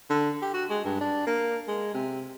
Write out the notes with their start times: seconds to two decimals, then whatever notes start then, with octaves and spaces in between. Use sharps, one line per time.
0.10 D3
0.42 G4
0.54 F#4
0.70 G#3
0.85 G2
1.00 D4
1.26 A#3
1.68 G#3
1.94 C3